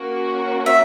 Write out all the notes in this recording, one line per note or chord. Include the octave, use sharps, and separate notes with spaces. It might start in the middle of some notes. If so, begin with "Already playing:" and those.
Already playing: A#3 C#4 F#4
E5